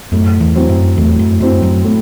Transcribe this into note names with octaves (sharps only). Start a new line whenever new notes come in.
F#2 A2
E2
F#3 C4 E4
F#2
E2 A2
F#2
F#2 F#3 C4 E4
F#2
A2